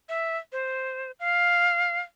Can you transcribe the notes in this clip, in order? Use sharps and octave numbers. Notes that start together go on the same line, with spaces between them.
E5
C5
F5